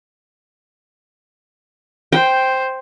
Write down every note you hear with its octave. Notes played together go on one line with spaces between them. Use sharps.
C5 G5